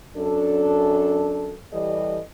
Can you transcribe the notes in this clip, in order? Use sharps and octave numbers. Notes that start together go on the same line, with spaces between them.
F#2 D4 A4
E3 G3 G4 A4 D5 D#5